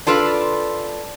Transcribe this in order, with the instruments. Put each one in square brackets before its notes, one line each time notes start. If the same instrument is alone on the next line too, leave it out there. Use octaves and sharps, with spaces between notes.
[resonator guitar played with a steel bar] D4 F4 A4 B4